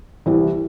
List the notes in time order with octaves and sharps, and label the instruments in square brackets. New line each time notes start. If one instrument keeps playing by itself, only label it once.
[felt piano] C2 C3 E3